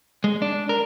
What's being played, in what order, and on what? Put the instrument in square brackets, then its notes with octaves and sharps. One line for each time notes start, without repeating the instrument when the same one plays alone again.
[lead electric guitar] G#3
D4
A#4